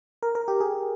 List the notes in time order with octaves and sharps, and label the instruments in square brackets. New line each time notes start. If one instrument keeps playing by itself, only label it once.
[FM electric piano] A#4
A#4
G4
G#4